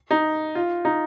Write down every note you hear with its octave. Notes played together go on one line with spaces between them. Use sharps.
D#4
F4
D#4